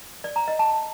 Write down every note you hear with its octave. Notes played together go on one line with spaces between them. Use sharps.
D5
A#5
D#5
A5